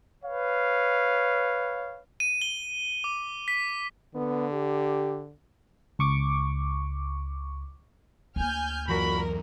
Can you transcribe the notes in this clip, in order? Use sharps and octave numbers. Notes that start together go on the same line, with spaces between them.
B4 C#5 F5
D#7
G7
D6
B6
D3 B3
G4
C#2 C#6 D6
D2 A#3 G#5 F6 G6
F#2 A#2 E3 F#3 F#4 A#4 B5